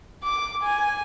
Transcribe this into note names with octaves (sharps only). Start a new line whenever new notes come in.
D6
G#5